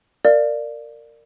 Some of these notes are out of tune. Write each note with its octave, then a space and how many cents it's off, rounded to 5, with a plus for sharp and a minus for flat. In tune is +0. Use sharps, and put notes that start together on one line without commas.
A#4 -20 D5 +10 F5 -20